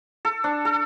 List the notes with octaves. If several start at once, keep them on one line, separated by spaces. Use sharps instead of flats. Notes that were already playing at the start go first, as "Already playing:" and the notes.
A4
D4
A4